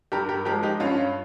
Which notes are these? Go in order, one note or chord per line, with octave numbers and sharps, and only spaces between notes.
G2 G4 A#4
G4 A#4
F3 G#3 G4 A#4
D#4 G4
G2 C#4 F4